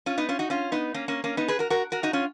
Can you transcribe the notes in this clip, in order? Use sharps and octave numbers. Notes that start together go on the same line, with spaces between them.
C#4 F4
B3 D#4
C#4 F4
D#4 F#4
C#4 F4
B3 D#4
A#3 C#4
A#3 C#4
A#3 C#4
B3 D#4
G#4 B4
F#4 A#4
F#4 A#4
F#4 A#4
D#4 F#4
C#4 F4